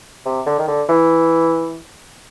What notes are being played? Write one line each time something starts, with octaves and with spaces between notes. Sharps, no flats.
C3
D3
D#3
D3
E3